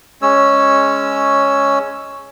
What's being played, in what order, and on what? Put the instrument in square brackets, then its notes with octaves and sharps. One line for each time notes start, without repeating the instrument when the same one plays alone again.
[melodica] G#3 C#4 C#5 E6